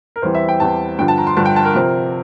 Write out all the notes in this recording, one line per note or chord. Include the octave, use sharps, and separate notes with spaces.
A#4
E2 E3 G3 C4 C5
E5
G5
E2 E3 G3 C4 A5
G2 D3 F3 G5
A5
A#5
C6
G2 D3 F3 A5
G5
A5
A#4
C3 F3 C4